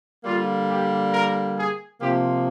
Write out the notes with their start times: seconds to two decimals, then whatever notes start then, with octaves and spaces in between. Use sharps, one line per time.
0.24 D3 G3 A#3 F4
0.69 G4
1.12 A#4
1.57 G#4
2.00 C3 F3 A#3 G4